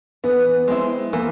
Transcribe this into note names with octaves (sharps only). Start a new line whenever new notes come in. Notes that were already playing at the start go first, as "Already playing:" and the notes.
E3 B3
G#3 C4 E4
E3 A#3